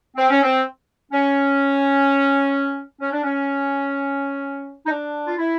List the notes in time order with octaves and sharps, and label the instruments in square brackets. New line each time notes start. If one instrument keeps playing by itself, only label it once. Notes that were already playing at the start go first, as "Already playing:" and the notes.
[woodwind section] C4
C#4
C4
C#4
C#4
D4
C#4
D#4
D4
F4
E4